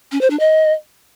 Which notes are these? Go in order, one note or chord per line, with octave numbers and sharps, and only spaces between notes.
C#4
C5
D4
D#5